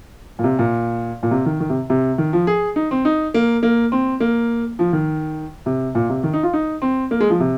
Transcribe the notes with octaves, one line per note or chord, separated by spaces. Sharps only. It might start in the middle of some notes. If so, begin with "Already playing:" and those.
A#2
C3
A#2
A#2
C3
D#3
D#3
C3
C3
D#3
F3
G#4
D#4
C4
D#4
A#3
A#3
C4
A#3
F3
D#3
C3
A#2
C3
D#3
D#4
F4
D#4
C4
A#3
G#3
F3
C3